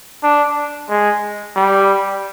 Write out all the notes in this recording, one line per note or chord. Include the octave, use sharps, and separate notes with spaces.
D4
G#3
G3